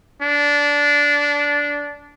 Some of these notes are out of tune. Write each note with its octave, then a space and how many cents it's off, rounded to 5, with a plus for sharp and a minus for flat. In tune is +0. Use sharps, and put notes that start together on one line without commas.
D4 -15